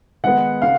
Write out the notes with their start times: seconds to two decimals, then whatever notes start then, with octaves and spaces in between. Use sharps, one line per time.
0.24 D#3 G#3 B3 F#5
0.62 C#3 F5